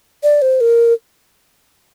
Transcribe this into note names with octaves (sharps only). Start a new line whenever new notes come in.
D5
C5
A#4